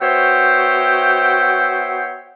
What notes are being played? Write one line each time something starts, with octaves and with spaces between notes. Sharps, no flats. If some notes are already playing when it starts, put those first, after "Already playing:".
B3 F#4 C5 C#5 E5 G5